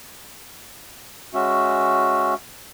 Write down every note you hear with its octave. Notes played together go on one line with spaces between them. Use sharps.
G#3 C#4 F#4 E5